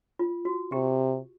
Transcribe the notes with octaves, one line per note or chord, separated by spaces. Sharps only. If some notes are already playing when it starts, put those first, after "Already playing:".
F4
F#4
C3 G4